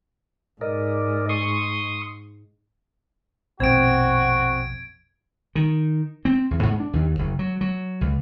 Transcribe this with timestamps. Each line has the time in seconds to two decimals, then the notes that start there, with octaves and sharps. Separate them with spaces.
0.61 G#2 A#4 D5 D#5
1.29 C6 C#6 D#6
3.60 A#1 F2 B2 C4 F#4 G#6 D7
5.55 D#3
6.25 C4
6.51 E2
6.63 G#2
6.80 D4
6.93 D#2
7.19 F#1
7.39 F#3
7.61 F#3
8.01 C#2